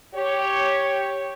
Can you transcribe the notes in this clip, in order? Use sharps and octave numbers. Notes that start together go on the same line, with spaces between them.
G4 C#5